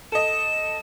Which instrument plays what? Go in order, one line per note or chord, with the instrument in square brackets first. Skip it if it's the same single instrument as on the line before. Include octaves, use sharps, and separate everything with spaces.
[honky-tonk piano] A4 D#5 [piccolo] E7